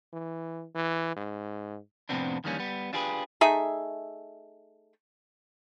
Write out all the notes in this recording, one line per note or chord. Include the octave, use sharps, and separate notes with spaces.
E3
E3
G#2
F2 A2 C3 B3 C4 D4
F2 D#3 E3 G3 A#3 C#4
G3 B3
D4 F4 G4 G#4 A#4 B4
A3 D#4 G#4 E5